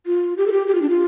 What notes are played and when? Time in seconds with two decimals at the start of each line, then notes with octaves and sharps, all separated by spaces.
0.06 F4
0.37 G4
0.47 A4
0.52 G4
0.67 G4
0.75 F4
0.82 D4
0.89 F4